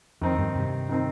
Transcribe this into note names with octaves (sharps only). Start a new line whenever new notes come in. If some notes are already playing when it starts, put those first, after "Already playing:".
F2 D#3 C4 D#4
G2
G2 C3
D#3 C4 D#4